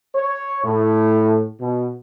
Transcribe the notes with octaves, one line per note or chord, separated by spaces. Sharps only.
C#5
A2
B2